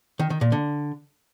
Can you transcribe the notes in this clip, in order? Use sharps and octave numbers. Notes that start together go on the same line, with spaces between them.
D#3
D#3
A#2
D3